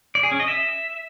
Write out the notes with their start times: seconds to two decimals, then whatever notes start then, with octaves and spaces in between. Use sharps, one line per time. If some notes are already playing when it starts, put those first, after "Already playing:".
0.15 D5
0.23 G#4
0.32 C#4
0.40 D#5
0.48 E5